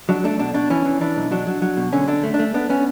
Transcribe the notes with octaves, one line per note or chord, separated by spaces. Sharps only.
F#3 D4
A3 D4
B2 D4
B2 D4
E3 C#4
E3
E3 D4
B1
F#3 D4
F#3
F#3
B2
D3 C#4
D3 D4
A3
D4
A3
B3 D4
B3 C#4